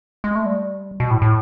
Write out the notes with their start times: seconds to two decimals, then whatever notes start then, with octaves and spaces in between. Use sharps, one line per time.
0.24 G#3
0.35 A3
0.46 G3
1.00 B2
1.11 A2
1.22 A2